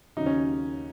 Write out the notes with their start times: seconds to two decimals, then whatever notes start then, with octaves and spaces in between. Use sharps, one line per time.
0.17 D#2 C#3 F#3 D#4
0.26 C#4